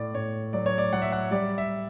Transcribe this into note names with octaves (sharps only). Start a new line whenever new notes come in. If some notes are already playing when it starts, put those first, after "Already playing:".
Already playing: A2 D5
A2 C#5
F#3 D5
C#5
D5
F#3 F#5
E5
F#5
G3 D5
E5